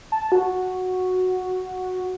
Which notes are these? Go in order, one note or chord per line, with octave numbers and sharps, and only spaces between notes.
A5
F#4